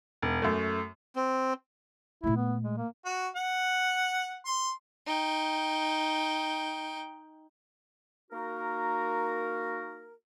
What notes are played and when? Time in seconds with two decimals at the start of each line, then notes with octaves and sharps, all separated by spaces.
0.22 E1
0.42 F#2 A3
1.16 C4
2.24 A#2 A3 E4
2.36 B3
2.64 G#3
2.77 A#3
3.05 F#4
3.36 F#5
4.45 C6
5.06 D#4 G5
8.31 A#3 D#4 F#4 A#4